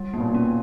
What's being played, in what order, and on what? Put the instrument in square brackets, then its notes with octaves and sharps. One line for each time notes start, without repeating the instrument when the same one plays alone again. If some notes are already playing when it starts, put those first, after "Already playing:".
Already playing: [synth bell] G3
[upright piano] B2 [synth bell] A#3
[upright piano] A#2
[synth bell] C#4